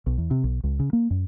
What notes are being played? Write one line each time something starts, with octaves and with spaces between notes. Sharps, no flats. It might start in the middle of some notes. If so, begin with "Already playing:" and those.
B1
E2
C3
B1
C#2
C#3
A#3
F#2